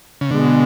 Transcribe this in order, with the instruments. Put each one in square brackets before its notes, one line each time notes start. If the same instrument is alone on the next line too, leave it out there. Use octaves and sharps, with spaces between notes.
[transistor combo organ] C#3
[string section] B2 G#3 B3 [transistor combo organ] D3